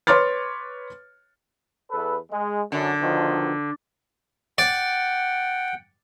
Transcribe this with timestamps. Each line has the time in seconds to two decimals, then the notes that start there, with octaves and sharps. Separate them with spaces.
0.07 B4 C#5 C6 D6 F6 A6
1.90 E2 A4 B4
2.32 G#3
2.72 F#2 D3
3.02 B2 D#3 F3
4.58 D5 F#5 G5